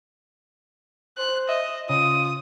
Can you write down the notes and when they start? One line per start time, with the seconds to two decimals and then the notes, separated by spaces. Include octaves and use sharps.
1.18 C5 F#6
1.49 D#5 E5
1.90 C#3 F4 D#6